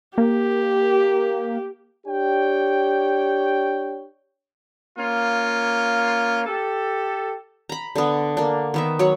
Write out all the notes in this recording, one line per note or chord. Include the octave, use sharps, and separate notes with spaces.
A#3 G4
D4 G4 C#5 G5
A#3 C#4 F4
G4 A4
A#5 B5
D3 B3
A#3 D4
D#3 B3 E5
F#3 C#5 F#5